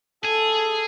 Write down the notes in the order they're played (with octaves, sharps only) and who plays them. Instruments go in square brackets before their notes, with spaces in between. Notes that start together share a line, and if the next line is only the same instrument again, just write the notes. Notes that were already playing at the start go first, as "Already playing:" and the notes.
[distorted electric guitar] G#4 [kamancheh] A4